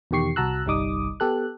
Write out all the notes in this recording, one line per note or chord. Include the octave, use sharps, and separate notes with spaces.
E2 B2 D#3 G4 C#6 C7
C2 F#4 A5 A#5 E6 F#6
G1 C2 G3 D#4 D6 D#6
B3 G4 A4 F#6